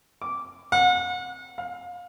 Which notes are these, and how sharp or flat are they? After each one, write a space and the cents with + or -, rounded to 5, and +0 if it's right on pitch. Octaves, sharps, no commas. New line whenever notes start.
D6 -10
F#5 -35
F5 +30